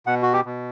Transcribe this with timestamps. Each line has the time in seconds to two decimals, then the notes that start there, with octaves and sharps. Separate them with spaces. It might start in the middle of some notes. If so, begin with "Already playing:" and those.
0.06 B2 F#5
0.23 F#4
0.33 G4
0.45 B2